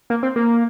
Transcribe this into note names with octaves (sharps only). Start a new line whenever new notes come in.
A#3
C4
A#3